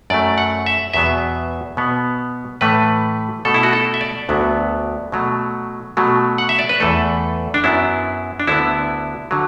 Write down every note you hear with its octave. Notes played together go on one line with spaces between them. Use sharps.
F#2 F#3 A3 D5
F#5
E5
E2 B2 F#3 B3 E5
B2 B3
A2 E3 A3 B4
B2 A3 A4
E4
F#4
A4
E5
D5
D2 D3 F#3 B3
B2 F#3 A3
B2 F#3 A3
F#5
E5
D5
B4
E2 E3 A3 A4
D4
F#2 F#3 B3 E4
D4
D2 D3 B3 E4
D3 F#3